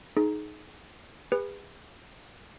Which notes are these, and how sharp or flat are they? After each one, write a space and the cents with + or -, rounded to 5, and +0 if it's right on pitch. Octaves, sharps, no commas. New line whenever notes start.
D#4 +0 G#4 +30
G#4 -40 B4 +0